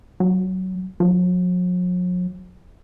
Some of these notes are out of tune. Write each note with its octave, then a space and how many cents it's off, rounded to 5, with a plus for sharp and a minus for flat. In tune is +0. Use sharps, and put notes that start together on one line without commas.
F#3 +15
F#3 -45